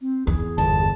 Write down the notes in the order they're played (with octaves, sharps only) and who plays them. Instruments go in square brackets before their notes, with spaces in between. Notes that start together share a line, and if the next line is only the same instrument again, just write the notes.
[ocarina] C4
[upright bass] E2 [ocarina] G#4
[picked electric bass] G1 [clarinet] A5